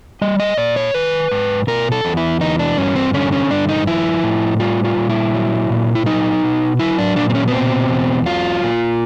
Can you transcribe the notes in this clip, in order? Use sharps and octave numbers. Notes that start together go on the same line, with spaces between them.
G3 D#5
D#5
A#2 D5
C#5
D#3 B4
G#2
B2 A#4
A4
E2
E4
E3 D#4
D4
G2 C#4
C4
D3 C#4
C#4
G2 D4
D#4
F3 E4
A2
G3 F4
F4
A#2
E4
F#3
A#2
E4
F#3 D#4
B2
F#3 E4
D4
A#2 D4
C4
C#4
B3
B2 C4
E2
F#3 F4
A#2